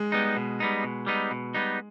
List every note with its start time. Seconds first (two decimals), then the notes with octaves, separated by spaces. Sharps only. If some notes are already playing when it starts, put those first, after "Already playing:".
Already playing: G#3
0.12 G3 B3 D#4
0.36 B2
0.60 G3 B3 D#4
0.84 B2
1.07 G3 B3 D#4
1.31 B2
1.54 G3 B3 D#4